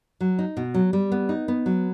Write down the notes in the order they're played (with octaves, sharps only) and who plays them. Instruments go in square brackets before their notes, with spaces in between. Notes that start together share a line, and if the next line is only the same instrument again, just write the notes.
[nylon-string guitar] F#3
D#4
B2
F#3
G3
B3
D#4
B3
F#3